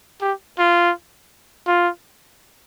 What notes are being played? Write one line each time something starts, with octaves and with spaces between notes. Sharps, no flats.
G4
F4
F4